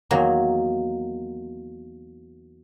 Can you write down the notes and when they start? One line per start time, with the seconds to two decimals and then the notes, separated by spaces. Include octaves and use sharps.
0.11 E2 D#3 F#3 A#3